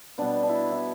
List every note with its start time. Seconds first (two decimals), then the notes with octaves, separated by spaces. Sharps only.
0.18 B2 G3 B3 D4
0.43 D4
0.49 E4
0.72 E4